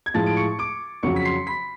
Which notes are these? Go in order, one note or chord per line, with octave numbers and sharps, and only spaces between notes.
G#6
A2 F3 G#3 A5 A6
D7
C#6 C#7
D6 D7
F2 C#3 F#3 C#6 C#7
B6
C6 C7
B5 B6